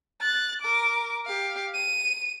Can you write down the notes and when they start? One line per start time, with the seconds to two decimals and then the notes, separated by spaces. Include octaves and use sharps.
0.21 F#6 A6
0.62 A#4 D6
1.25 G4 F5
1.74 D#7